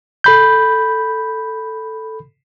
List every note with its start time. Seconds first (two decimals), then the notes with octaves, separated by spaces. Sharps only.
0.24 A4 B5 G6